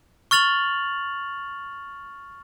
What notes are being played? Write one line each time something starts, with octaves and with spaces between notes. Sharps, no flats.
C#6 F6 A6 F7 F#7